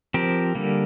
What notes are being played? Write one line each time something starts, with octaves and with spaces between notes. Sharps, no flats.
F3 C4 G4 A#4
D3 G3 A#3